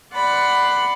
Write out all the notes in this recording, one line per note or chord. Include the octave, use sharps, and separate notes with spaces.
D5 F#5 B5 C6